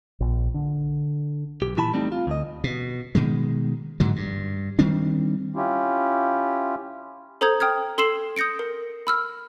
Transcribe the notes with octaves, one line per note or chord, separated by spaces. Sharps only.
A#1
D3
B1 G4
A#2 E3 E4 A5 B5
G3 A3 C4 D#4
F4
D2 D#5
B2
B2 D#3 G#3
G#2 D3 F#3
G2
D#3 G3 C4 D4
C#4 E4 F4 G4
A4 C5 A#5 D#6 G6 G#6
G5 D#6 F6 G#6
A4 C6 E6 C7 E7 F#7
D#6 G6 A#6 C#7 D7
A#4
B5 E6 F6